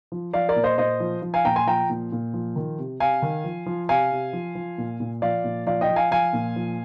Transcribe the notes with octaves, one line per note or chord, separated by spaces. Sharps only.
F3
F3 D5 F5
A#4 D5
A#2
C5 D#5
A#2 C5 D#5
F3
F3
F5 G#5
A#2 G5 A#5
G#5 C6
F3 G5 A#5
A#2
A#2
F3
D#3
C3
C3 F5 G#5
D#3
F3
F3
C3 F5 G#5
C3
F3
F3
A#2
A#2
F3 D5 F5
A#2
F3 D5 F5
D#5 G5
F3
F5 G#5
F3 F5 G#5
A#2
F3